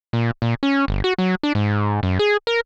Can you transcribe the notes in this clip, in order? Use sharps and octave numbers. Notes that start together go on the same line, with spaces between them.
A#2
A#2
C#4
G1
F#4
F#3
D4
G#2
F#2
G#4
A#4